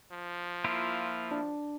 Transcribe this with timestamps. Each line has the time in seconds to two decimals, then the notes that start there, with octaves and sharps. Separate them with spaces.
0.11 F3
0.64 A#3 E4 F4
1.31 D4